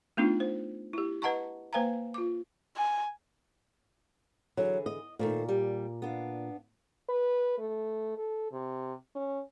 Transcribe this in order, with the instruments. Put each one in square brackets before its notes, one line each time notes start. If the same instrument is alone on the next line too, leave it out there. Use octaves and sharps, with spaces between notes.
[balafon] A3 B3 D4 D#4 F4
C5
E4 G4
B4 D#5 F#5 A5 A#5 C#6
A#3 B4 C5 F5 G#5 A#5
F4 D6
[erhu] G#5
[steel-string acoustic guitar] D3 E3 G#4 [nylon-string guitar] F#3
[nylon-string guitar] D#5
[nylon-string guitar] A#2 [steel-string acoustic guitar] D#3 A3 C5
[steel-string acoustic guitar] G3
B3 D4 F5
[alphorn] B4
A3
A4
C3
C#4